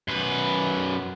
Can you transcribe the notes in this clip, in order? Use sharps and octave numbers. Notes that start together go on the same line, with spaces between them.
F#2 B4